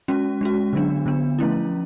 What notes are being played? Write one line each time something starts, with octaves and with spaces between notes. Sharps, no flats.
G#3 C#4 F#4
G#3 C#4 F#4
D3 F#3 B3 D4
D3 F#3 B3 D4
F3 A3 C#4 E4